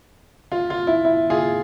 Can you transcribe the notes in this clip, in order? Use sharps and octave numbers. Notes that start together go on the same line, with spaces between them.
F4
F4
E4
E4
F4 G#4